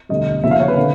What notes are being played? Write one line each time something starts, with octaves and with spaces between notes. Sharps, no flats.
E1 D2 D3 G3 D#5
D#2 C#3 F3 E5
F5
C#5
B4
D3